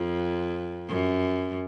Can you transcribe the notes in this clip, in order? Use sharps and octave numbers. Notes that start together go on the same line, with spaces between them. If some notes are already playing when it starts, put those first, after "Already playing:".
Already playing: F2
F#2